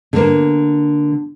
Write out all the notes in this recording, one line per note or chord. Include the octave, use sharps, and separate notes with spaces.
D3 A#3